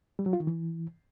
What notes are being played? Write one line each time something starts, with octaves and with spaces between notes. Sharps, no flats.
G3
F#3
F4
D#3
E3